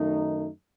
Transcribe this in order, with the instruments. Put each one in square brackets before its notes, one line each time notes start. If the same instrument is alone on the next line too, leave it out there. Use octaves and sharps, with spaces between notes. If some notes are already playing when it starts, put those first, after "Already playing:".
Already playing: [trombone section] F#2 D#3 A3 D#4